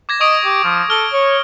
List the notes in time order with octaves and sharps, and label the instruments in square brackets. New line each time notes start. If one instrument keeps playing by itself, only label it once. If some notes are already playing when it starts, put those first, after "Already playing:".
[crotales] D6 G#6 A#6
[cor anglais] D#5 [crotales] C#6 D#6 D7
[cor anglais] G4
F3
[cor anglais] A4 [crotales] F6 G7
[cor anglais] C#5